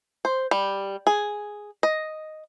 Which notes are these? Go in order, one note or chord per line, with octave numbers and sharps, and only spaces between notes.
C5
G3
G#4
D#5